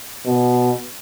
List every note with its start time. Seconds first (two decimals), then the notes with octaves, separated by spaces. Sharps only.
0.25 B2